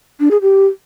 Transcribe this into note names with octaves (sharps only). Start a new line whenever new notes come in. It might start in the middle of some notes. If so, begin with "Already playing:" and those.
D4
G#4
G4